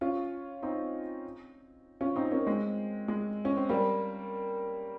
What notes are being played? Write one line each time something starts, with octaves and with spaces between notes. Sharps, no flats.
C#4 F4
C4 D#4
C#4 F4
C4 D#4
A#3 C#4
G#3 C4
G#3
C#4
C4
G3 A#3